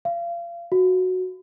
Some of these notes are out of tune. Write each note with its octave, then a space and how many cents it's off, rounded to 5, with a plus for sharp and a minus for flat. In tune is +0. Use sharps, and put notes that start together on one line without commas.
F5 -35
F#4 -5